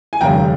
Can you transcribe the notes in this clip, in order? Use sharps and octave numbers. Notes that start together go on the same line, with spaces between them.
G#5
F1 D#2 C#3 G3 G5 A#5